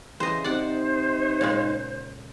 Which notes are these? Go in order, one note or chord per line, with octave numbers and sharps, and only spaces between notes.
C#3 E3 C5 D#5
C3 D#4 C5 D5 F#5
A#2 C#3 G#3